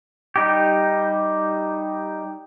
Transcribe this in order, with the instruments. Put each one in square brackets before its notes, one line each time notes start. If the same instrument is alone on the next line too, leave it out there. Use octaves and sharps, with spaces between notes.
[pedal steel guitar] G3 D#4 G4